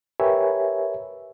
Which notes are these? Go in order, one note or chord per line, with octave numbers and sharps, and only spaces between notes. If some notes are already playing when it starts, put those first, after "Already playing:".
G4 A#4 B4 C#5 E5 G#5